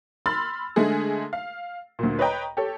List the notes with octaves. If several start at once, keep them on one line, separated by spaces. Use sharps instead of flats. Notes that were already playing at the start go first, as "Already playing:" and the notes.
B5 C6 E6 F6 A6
D3 G#3 A3 G#4
F5
D2 A#2
B4 C#5 D#5 G5 A#5
G4 A4 C#5